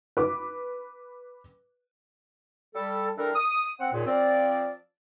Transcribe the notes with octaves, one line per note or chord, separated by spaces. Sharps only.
B4 D6
G3 A4
E3 G3 D4 A4 A#4
D#6
C4 F#5
D#2 A#2 G#4
F3 C4 D5